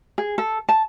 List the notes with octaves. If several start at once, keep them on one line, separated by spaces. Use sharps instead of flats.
G#4
A4
A5